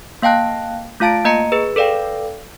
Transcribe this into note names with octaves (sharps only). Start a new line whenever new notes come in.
A#3 F5 G5 A5 F#6
A3 F4 F5 A5 A6 D7
A#3 D#5 A#5 C#7
G#4 B4
A4 B4 D5 F5 G5